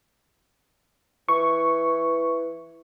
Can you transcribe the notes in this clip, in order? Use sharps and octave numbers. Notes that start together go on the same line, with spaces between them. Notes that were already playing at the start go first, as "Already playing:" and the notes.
E3 C#6